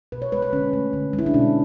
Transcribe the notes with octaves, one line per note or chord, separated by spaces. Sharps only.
B2 B4
C#5
G#3 B4
B4
D3 C#4
A3
D3
G#3
E4
D4
B2 C#4